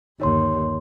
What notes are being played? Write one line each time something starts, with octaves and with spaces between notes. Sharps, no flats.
G1 D#2 D#4 C#5 C6